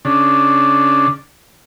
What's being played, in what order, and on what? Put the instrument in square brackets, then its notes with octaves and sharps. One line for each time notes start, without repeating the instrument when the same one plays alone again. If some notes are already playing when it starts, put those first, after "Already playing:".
[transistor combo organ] C#3 D4